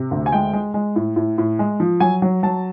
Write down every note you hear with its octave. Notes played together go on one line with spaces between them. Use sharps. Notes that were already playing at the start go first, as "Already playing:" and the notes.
Already playing: C3
D2
G#5
G#3 G5
G#3
G#3
A2
A2
A2
G#3
F3
F#3 G#5
F#3
F#3 A5